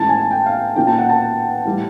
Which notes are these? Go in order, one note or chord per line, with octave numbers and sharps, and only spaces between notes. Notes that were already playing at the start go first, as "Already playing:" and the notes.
Already playing: A2 E3 G#3 C#4 A5
G#5
G5
F5
A#2 F3 A#3 C#4 G5
A5
F#5
A5
A2 E3 G3